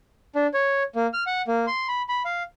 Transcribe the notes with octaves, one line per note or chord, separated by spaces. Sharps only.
D4
C#5
A#3
F6
F#5
A#3
C6
B5
B5
F5